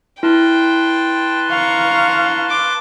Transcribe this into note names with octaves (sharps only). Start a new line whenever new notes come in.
E4 B4 G5 A5 C6
F5 A#5 C#6
D6